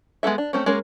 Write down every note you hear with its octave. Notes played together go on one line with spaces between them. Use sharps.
G#3 B3 D4 A4 E5
D4
A3 C4 C#4
G#3 A#3 C#4 A#4